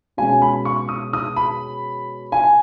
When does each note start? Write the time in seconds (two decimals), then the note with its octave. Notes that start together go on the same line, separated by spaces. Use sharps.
0.17 B2 G#3 C#4 G#5
0.42 B5
0.65 C#6
0.89 D#6
1.13 D#6
1.36 B5
2.32 G#5